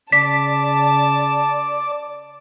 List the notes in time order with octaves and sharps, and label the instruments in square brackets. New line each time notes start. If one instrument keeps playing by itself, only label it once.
[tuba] C#3 [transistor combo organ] D5 D6 [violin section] A5 [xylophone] B6